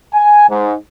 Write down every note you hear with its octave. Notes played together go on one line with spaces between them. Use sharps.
G#5
G#2